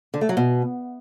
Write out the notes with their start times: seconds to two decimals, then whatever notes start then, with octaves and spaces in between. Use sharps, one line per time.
0.14 D3
0.21 A3
0.29 F#3
0.37 B2